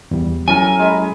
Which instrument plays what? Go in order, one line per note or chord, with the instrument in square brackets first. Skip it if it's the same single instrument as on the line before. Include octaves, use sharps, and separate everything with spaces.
[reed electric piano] E2 G3
[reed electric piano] F#3 C#4 E4 [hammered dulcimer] A4 A#4 [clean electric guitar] G#5
[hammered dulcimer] G#3 B5